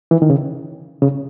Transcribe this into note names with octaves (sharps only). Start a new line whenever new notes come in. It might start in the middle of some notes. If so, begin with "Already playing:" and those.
E3
D#3
C#3
C#3